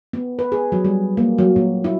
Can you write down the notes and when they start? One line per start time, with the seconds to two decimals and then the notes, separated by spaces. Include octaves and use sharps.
0.13 B3
0.39 B4
0.52 G#4
0.72 F#3
0.85 G3
1.17 A#3
1.38 F#3
1.56 A#2
1.84 E4